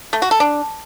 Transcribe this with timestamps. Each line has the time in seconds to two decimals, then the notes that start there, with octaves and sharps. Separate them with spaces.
0.13 A3
0.22 F#4
0.31 A4
0.40 D4